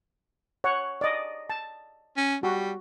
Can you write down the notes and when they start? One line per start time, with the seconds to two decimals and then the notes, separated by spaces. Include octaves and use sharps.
0.64 C#5 F#5
1.01 D5 D#5
1.50 A5
2.17 C#4
2.43 G3 F#4